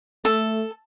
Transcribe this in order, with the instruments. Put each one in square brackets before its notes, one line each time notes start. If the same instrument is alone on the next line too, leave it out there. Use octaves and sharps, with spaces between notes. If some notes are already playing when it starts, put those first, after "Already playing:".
[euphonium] A3 [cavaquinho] A4